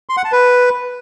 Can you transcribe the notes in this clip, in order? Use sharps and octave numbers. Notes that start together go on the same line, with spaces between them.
C6
F#5
A5
B4